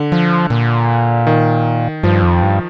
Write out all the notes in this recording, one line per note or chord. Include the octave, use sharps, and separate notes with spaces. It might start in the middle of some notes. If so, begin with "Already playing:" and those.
Already playing: D3
F3
A#2
D#3
G2 F3
F2
G2